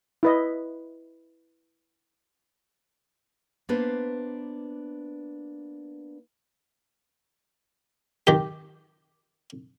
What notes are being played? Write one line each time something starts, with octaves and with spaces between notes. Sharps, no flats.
E4 B4 D#5
A#3 B3 D4 B4 C5
D#3 G4